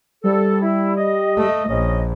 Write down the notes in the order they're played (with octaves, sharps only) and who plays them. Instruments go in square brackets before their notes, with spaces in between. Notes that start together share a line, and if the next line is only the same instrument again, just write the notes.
[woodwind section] C2 A4 [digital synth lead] G3
[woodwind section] E4
D#5
[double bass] A3
[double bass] A#1 [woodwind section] C#4 D#5